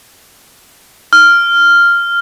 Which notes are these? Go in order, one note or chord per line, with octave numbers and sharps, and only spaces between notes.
F6